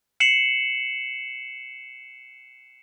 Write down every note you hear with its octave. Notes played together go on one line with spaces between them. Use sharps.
C7 C#7 E7 F#7